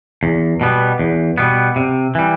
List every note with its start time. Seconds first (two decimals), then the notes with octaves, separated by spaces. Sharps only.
0.23 E2
0.61 B2 G3 B3
0.99 E2
1.38 B2 G3 B3
1.76 C3
2.15 E3 G3